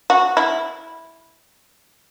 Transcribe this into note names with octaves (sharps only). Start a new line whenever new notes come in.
F#4
E4